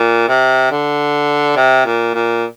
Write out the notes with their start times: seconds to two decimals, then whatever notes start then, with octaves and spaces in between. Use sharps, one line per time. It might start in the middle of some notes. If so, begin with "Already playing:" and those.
Already playing: A#2
0.29 C3
0.72 D3
1.56 C3
1.85 A#2
2.14 A#2